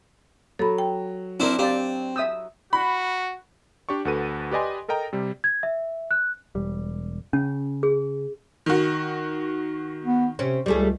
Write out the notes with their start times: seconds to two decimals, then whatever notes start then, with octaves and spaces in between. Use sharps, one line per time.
0.59 F#3 A4 B5
0.78 G5
1.40 C4 D4 E4 A#4
1.59 C4 G4 D5 F5
2.16 E5 D#6 E6 G6
2.73 F#4 B5
3.89 D4 G4 D5 C#6
4.05 D2 F#4 A4 B4 D#7
4.51 G4 B4 D5 D#5 G#5 C6
4.88 A4 A#4 D#5 G5 A#5
5.13 C3 G3
5.44 G#6
5.63 E5
6.11 F#6
6.55 E1 G3
7.33 C#3 C#4
7.83 G#4
8.66 D#3 F#4
10.04 B3
10.39 C3 C4 C#4
10.66 C#2 G3 A3 G#4